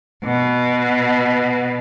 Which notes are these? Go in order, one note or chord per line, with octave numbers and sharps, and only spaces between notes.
B2